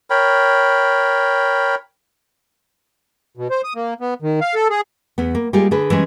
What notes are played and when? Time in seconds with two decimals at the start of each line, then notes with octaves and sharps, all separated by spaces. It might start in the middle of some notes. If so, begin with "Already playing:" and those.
0.10 A#4 C#5 G5 B5
3.37 B2
3.50 C5
3.64 D#6
3.76 A#3
4.01 B3
4.22 D#3
4.41 F5
4.55 A4
4.70 G#4
5.18 E2 B3
5.35 A#3
5.53 G3 G#3 A#3 F4 G4 G#4
5.71 D3 G#4 B4
5.90 E3 G3 G#3 C#4